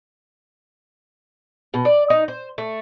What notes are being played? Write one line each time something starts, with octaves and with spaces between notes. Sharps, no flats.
B2
D5
D#4
C5
A3